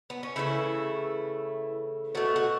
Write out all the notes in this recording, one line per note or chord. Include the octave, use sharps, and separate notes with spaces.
B3
C#4
C#3 E3 A3 E4
B2 A3 F#4
F#4